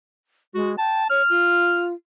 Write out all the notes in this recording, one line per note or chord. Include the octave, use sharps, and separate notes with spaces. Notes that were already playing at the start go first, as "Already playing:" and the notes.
G#3 F#4
G5 A5
C#5 F6
F4